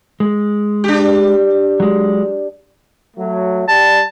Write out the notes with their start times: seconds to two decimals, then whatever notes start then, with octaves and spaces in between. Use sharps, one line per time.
0.20 G#3
0.84 D4 G4
1.80 F#3 G#3
3.16 F#3 A3
3.68 G3 A5